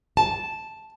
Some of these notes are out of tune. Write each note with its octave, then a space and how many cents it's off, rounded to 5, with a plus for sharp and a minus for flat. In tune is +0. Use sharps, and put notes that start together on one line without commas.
A5 -5